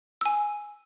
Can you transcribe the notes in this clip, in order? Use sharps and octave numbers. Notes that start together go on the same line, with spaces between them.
G#5 E6